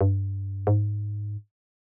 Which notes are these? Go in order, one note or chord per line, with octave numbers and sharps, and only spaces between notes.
G2
G#2